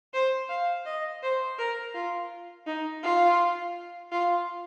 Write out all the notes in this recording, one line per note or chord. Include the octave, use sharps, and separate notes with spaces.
C5
F5
D#5
C5
A#4
F4
D#4
F4
F4